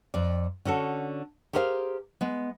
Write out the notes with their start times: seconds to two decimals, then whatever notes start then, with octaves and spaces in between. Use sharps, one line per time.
0.14 F2 D5
0.65 D3 C#4 F#4 A4
1.53 G4 G#4 A#4 C5 E5 F5
2.21 G#3 B3